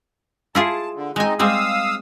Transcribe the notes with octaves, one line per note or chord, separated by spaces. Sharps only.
E4 F4 G#4 A5
D3
G#3 C4 D#4 D#5 G#5
G3 G#3 C4 F5 D#6 E6